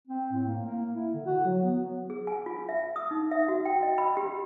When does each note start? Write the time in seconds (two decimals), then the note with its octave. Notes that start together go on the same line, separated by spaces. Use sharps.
0.08 C4
0.32 A2
0.47 A#3
0.65 A#3
0.94 E4
1.14 D3
1.26 F#4
1.45 F#3
1.63 B3
2.10 G#4
2.27 G#5
2.46 F4
2.69 E5
2.96 D#6
3.11 D#4
3.31 E5
3.48 F#4
3.65 G5
3.83 D#5
3.98 B5
4.17 G4